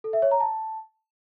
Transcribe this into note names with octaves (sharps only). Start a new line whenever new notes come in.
A4
E5
C#5
A#5
A5